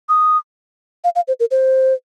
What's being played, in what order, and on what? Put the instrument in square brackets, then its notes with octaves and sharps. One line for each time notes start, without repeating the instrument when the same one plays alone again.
[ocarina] D#6
F5
F5
C5
A#4
C5